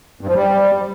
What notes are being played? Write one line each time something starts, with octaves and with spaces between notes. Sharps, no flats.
G2
F3
G3